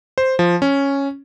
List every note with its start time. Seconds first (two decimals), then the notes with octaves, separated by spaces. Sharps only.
0.18 C5
0.39 F3
0.62 C#4